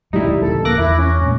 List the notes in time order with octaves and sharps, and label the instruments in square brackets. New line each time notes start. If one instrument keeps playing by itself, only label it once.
[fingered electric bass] D#1 D2 F3 [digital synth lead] G3 [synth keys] D#4 E4
[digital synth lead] A4
[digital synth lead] A#3 [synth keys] D6 F#6 A#6
[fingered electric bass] E2 [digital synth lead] E4
[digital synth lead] C#4
[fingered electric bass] G2 A#2